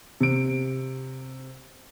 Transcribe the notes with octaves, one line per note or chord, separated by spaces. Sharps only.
C3 D7